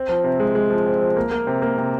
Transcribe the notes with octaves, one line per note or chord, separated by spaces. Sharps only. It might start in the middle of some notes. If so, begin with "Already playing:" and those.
Already playing: C4
F3
C3
G#3
G#3
F3
C4
F3
A#3
A#3
C3
A#3
C3